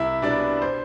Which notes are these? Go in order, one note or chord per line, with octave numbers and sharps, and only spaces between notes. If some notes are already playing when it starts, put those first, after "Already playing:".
Already playing: C2 E4 E5
B2 G3 B3 D4 D5
C5